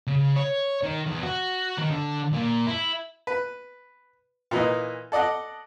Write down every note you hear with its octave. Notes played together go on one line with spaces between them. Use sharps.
C#3
C#5
D#3
E2
F#4
D#3
D3
A#2
E4
B4
A#2 E3 D#4
A4 D5 D#5 F#5